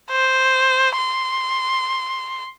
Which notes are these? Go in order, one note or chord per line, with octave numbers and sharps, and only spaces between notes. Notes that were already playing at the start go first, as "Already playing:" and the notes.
C5
C6